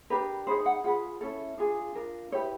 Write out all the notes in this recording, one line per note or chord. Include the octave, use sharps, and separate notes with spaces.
D4 G4 A#4 B4
D#4 G#4 B4 C5
F#5
F4 G#4 B4 F#5
C#4 E4 A4
D4 F4 G#4
D4 F4 A#4
E4 G4 B4 C#5